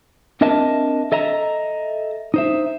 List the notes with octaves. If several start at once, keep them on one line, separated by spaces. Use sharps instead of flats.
C4 D4 A#4 D#5 E5 A5
A4 D#5 E5 A#5
D#4 C5 E5